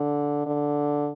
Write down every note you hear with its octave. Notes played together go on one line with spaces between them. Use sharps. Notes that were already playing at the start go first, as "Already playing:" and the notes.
Already playing: D3
D3